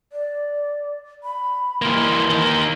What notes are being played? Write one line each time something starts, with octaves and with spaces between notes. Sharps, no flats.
D5
B5
E3 A#3 C6
A#3 D#4